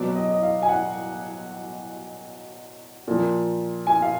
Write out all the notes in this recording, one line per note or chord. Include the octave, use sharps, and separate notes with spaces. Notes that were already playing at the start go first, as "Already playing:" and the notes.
Already playing: B2 F#3 D5
D#5
D#5
F5
G#5
F#5
A#2 F3
G#5
F5